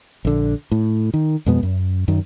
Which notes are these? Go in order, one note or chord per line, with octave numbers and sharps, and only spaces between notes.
A#1 D3
A2
D#3
F2 B2 G#3 B3
F#2
F#2 D#3